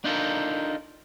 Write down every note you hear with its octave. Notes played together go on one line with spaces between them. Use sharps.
D4 D#4 F4 F#4 A4 A#4